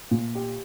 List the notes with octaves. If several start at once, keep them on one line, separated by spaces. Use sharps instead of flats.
A#2
G4